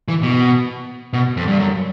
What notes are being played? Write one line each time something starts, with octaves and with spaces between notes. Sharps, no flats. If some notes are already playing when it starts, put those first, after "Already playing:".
E3
B2
B2
F2
G2
F#2